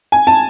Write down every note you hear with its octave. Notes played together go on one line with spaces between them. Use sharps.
G#5
A5